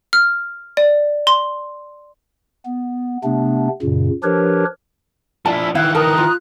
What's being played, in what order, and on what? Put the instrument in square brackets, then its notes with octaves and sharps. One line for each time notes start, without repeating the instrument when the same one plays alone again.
[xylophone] F6
D5
C6
[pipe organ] B3
C3 A3 B3 D4
F#2 A#2 C#3
F3 D4 G4 A#4 B4 C#5
[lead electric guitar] F3 D4 [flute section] E4 [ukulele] A5
[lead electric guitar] D#3 E3 [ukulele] E4 F5 [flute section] F#6
[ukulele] A#4 A5 [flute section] A#5 D#6 F#6
[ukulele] F4